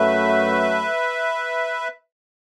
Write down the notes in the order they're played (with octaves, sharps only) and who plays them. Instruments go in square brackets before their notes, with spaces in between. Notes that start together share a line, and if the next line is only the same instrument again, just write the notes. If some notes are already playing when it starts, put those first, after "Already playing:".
Already playing: [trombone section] F#2 F#3 A3 [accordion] B4 E5